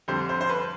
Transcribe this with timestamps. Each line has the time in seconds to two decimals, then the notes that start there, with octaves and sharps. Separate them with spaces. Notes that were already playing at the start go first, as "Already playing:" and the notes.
0.08 F2 D3 G3 C5
0.29 C5
0.41 C5
0.49 B4